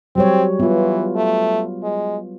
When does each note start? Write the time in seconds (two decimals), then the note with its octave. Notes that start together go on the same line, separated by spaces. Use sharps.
0.16 F#3 G3 C4 C#5
0.60 E3 B3 F4
1.16 A3
1.83 G#3